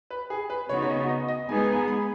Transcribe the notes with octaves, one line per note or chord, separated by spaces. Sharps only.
B4
G#4
B4
C#3 B3 D#4 F#4 C#5
C#5
D#5
D#5
D#5
G#3 B3 D#4 G#4 G#5
B5